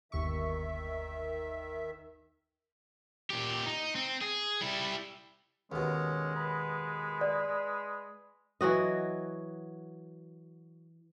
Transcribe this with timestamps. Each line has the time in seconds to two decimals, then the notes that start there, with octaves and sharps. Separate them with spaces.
0.12 G1 D#2 D#3 E5 C#6
3.30 A#2 G4
3.66 D#4
3.95 C4
4.21 G#4
4.61 G3 E4
5.72 D#2 B2 G#3 C#4
6.36 B4
7.21 D5
8.61 E3 F#3 F#4 D#5